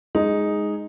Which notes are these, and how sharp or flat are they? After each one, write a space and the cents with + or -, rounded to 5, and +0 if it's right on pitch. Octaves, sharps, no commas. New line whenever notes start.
G#3 +0 D#4 +0